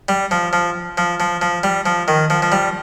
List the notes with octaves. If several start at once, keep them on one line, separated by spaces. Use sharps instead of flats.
G3
F3
F3
F3
F3
F3
G3
F3
D#3
F3
F3
G3